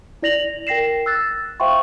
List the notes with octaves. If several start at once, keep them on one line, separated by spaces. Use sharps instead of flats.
E4 D5 A#6 F7 F#7
A#4 G5 A#6 C7 E7
E6 F#6 A6
C5 E5 F5 G5 C6 C#6